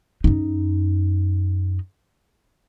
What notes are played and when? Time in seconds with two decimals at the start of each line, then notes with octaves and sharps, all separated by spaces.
0.24 F#2 D#4